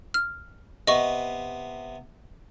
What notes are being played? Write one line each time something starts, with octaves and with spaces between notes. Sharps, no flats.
F6
C3 B3 D#5 C#6